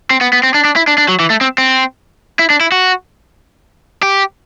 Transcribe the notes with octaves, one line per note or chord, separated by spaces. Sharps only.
C4
B3
B3
C4
D4
D4
E4
D4
D4
F#3
E3
A3
C4
C4
E4
D4
E4
F#4
G4